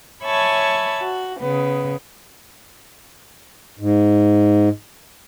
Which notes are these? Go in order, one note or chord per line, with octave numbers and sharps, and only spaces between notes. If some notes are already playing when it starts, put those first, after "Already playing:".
C#5 E5 G#5 A5 B5 C#6
F#4
C#3 B3
G#2